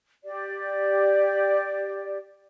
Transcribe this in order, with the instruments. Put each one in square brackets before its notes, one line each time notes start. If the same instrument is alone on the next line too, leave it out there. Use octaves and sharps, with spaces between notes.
[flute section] G4 D5